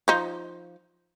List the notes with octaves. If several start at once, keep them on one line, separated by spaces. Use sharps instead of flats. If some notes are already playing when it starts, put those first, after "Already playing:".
F3 D#4